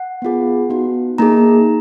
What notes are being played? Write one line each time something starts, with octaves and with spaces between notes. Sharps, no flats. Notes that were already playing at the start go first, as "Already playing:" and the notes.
Already playing: F#5
B3 F4 G#4
B3 D#4 F#4
A#3 D#4 G#4 A#5